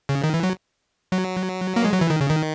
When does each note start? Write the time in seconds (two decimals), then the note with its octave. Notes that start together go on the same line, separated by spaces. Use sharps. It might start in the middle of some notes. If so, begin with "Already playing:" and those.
0.09 C#3
0.24 D#3
0.34 E3
0.43 F#3
1.12 F#3
1.76 A#3
1.84 G#3
1.93 F#3
2.01 E3
2.10 D#3
2.21 C#3
2.30 D#3